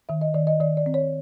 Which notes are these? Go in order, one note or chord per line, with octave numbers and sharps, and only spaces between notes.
D#3 E5
D#5
D#3 D5
D#5
D#3 D5
D5
C4
C#5